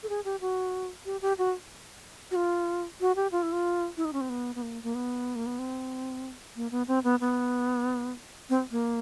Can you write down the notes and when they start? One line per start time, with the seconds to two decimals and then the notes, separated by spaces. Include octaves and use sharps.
0.03 A4
0.09 G#4
0.25 G4
0.41 F#4
1.06 G4
1.22 G4
1.38 F#4
2.31 F#4
2.36 F4
3.01 F#4
3.16 G4
3.32 F4
3.43 E4
3.52 F4
3.97 E4
4.05 D#4
4.13 C#4
4.21 C4
4.30 B3
4.55 B3
4.62 A#3
4.83 A#3
4.95 B3
5.36 A#3
5.46 B3
5.59 C4
6.56 A#3
6.71 B3
6.88 C4
7.04 B3
7.20 B3
8.50 C4
8.71 A#3